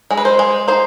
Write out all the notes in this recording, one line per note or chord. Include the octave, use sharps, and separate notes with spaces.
G#3
B4
C5
G#3
D#4 C5